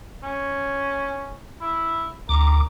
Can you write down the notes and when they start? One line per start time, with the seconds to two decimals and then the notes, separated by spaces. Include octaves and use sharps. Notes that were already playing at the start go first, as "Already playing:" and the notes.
0.23 C#4
1.61 E4
2.29 D2 A#4 D6